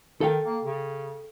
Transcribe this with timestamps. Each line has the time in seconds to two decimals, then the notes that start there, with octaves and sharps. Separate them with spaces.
0.21 D#3 A4 F5 G5
0.46 A#3
0.64 C#3